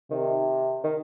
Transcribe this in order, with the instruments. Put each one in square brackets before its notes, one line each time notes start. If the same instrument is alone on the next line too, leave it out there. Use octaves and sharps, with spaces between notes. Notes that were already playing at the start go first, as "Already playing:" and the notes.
[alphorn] C3 [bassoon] D#3
[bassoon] D#3